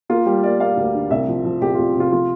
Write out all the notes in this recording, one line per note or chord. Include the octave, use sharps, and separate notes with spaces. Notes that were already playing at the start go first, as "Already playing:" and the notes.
A#3 F4
G3 G4
A#3 D5
A#3 F5
D2
D3
C2 E5
F3
F3
C2 G4
C2 F4
C3 F4
F3 F4